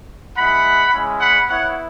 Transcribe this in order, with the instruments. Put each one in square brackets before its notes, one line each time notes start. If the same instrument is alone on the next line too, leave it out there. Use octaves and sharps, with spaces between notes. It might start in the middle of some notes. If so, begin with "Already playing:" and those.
[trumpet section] G#3 E4 F#5 B5
G#3 C#4 E4
F#5 B5
B3 E4 C#5 F#5